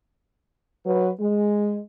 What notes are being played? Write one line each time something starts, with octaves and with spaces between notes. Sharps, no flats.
F#3 B4
G#3